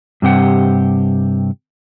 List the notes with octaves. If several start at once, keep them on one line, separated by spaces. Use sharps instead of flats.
G2 C3 G4 F#5